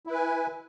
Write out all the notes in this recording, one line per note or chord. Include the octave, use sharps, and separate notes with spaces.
E4 B4 G#5